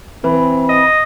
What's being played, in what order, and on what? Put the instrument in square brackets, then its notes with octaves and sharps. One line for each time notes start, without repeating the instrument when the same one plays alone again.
[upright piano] E3 [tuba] C4 [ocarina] B5
[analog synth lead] D#5